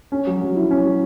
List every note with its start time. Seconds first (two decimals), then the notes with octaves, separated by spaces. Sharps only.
0.12 C#4
0.27 F#3
0.41 F#3
0.56 E4
0.71 C#4
0.85 F#3